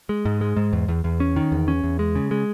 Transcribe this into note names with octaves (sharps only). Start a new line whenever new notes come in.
G#3
G#2
G#3
G#2
E2
E2
E2
C#4
D#3
E2
C#4
E2
G#3
C#3
G#3